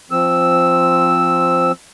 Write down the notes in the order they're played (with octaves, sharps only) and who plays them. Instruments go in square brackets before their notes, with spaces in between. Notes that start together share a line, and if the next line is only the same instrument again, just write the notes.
[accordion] F3 C4 E6